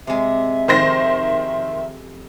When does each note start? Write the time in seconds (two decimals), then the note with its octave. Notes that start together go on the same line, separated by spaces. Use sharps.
0.07 C3 G#3 E5
0.68 F2 D#3 C5 A#6